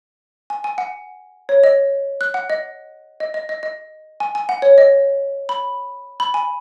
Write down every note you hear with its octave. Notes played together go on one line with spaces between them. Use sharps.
G#5
G#5
F#5
C#5
D#5
F#6
F#5
D#5
D#5
D#5
D#5
D#5
G#5
G#5
F#5
C#5
D#5
B5
B5
G#5